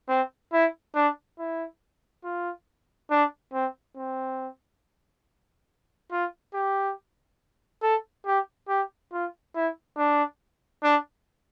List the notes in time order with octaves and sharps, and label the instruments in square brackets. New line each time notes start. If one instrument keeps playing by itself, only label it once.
[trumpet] C4
E4
D4
E4
F4
D4
C4
C4
F4
G4
A4
G4
G4
F4
E4
D4
D4